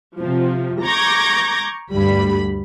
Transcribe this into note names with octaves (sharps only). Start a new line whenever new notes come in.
C3 F3
A#5 C#6 D6 G6 G#6 A#6
D2 G2 G3 B5